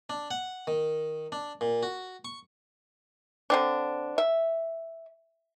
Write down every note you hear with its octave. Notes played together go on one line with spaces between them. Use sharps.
D4
F#5
D#3
D4
A#2
F#4
C#6
D3 C4 D4
E5